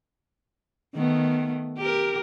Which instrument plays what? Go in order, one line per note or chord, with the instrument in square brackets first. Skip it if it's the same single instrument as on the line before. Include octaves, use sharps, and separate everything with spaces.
[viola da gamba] D#3 A3 B3
G4 A#4